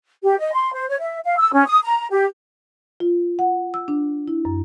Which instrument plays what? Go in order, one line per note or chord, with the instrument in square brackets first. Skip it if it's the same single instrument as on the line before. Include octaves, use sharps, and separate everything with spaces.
[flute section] G4
D#5
C6
C5
C#5
E5
F5
E6
C#4
D#6
A#5
G4
[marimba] F4
F#5
E6
D4
E4
F#2